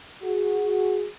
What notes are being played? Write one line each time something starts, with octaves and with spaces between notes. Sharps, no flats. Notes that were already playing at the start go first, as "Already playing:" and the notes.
F#4 G#4